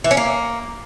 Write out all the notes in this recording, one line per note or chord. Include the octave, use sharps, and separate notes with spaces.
E3
C#4
A#3